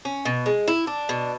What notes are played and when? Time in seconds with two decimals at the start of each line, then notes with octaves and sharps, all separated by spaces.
0.05 C#4
0.25 B2
0.46 G#3
0.68 E4
0.87 D4
1.09 B2